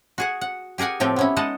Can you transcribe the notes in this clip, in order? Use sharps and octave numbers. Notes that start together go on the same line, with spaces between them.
F#4 G#4 F#5
F#5
G4 G#4 A#4 F#5 G#5
A2 F3 C4 G4 A4
B3 C#4 E4
G#3 D#4 D#5 F#5 A5